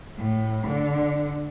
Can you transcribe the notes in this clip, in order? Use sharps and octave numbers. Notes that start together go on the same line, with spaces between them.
A2
D3